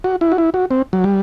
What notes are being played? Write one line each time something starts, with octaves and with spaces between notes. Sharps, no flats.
F#4
E4
F#4
E4
F#4
C4
F#3
G3